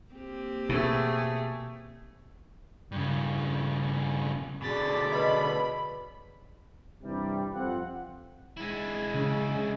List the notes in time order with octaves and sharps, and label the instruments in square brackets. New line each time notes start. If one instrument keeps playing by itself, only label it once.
[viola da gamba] A#3 C4 G4
[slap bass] B2 [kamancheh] A3 G#4
[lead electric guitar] G2 C#3
[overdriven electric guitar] B2 D3 [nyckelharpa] G#4 D5 [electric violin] A6 B6
[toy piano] B4 C#5 D#5 [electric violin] B5
[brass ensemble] G2 C3 E3 G3
F2 C4 F4 F#5
[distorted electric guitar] G#3 E4
[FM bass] C#3